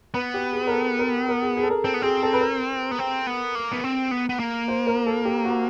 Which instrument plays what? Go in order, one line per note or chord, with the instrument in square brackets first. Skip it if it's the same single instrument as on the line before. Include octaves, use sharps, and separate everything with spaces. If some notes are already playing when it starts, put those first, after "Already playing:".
[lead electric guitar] B3 [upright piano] B4
[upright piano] G4
G#4
A#4
A4
A#4
A#4
G#4
G#4
A4
A#4
[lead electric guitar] C4 [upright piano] A4
[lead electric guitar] B3
[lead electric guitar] C4 [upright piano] G#4
[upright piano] A4
B4
A#4
[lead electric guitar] B3
C4
B3
A#3
B3
C4
B3
B3
A#3
[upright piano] C5
A#4
A4
G4
F#4